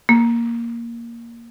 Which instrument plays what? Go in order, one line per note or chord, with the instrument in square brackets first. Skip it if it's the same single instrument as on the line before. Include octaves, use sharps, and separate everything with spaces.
[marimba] A#3